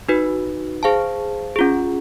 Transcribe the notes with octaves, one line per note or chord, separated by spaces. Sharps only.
D#4 F#4 B4
G#4 C5 F5 A5
C#4 F4 G#4